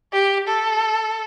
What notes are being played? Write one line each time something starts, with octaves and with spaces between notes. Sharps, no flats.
G4
A4